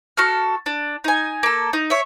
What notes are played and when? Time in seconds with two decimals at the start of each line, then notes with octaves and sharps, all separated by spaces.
0.17 F#4 A4 F6
0.66 D4
1.04 D#4 G#5
1.43 A#3 A4
1.73 D#4
1.90 C#5 E5